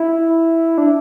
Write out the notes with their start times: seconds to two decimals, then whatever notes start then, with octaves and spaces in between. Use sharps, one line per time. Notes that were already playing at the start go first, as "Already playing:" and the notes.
Already playing: E4
0.78 D4